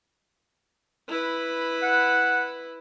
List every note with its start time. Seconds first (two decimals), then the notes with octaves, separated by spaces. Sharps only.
1.08 E4 B4
1.83 F#5